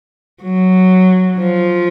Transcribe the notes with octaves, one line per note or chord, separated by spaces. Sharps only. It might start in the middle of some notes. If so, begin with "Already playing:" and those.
F#3
F3